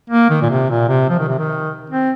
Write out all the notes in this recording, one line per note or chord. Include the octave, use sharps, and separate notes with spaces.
A#3
D#3
A#2
C3
A#2
C3
F3
D#3
C3
D#3
C4